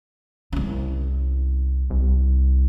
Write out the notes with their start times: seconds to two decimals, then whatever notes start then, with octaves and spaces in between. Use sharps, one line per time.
0.52 C2 C#4
1.90 C2